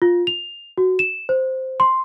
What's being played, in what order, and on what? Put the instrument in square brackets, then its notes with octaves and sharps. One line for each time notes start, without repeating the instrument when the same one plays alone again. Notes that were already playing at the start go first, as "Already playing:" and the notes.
[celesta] F4
F7
F#4
E7
C5
C6